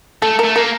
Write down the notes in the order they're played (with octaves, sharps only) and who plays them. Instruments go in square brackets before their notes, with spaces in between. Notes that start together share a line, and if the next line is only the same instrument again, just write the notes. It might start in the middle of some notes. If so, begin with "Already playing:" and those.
[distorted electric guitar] A3 [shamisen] A4
[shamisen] A#4
[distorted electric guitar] A3
[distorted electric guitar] A#3 [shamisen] A#4